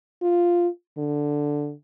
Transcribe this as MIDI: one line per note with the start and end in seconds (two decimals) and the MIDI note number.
0.22 0.68 65
0.97 1.72 50